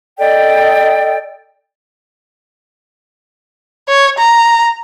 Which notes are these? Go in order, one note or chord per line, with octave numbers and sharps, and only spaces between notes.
A4 D5 D#5 G5
C#5
A#5